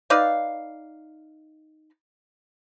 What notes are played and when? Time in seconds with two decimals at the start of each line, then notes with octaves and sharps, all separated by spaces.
0.10 D#4 B4 D5 F5